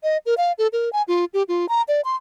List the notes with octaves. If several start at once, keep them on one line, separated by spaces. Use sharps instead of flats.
D#5
A#4
F5
A4
A#4
G#5
F4
G4
F4
A#5
D5
C6